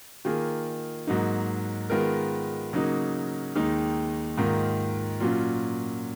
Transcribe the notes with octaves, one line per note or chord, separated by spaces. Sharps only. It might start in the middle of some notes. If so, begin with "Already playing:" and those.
D#3 A#3 F4 G#4
G#2 F#3 A#3 D#4
D#3 G#3 B3 F4 A#4
C#3 F#3 A#3 D#4
D#2 D#3 G#3 D#4
G#2 D#3 A#3 F4
A#2 F#3 C#4 F4